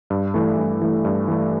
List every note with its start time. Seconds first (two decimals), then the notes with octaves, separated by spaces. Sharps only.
0.10 G2
0.34 E3 A3
0.58 G2
0.82 E3 A3
1.05 G2
1.28 E3 A3